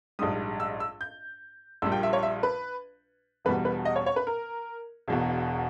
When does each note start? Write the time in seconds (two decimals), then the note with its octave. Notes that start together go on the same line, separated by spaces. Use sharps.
0.19 A#1 G#2 G3 D#6
0.60 E6
0.80 E6
1.01 G6
1.82 A#1 A#2 G3 E6
1.92 G5
2.03 E5
2.13 C#5
2.23 E5
2.43 B4
3.45 E1 E2 B2 G3 B4
3.65 B4
3.85 D#5
3.96 C#5
4.06 C#5
4.16 B4
4.27 A#4
5.08 E1 E2 B2